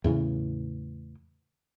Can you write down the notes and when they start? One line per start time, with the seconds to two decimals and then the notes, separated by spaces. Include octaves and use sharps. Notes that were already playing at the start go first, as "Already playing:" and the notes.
0.04 E2 A2 C#3 E3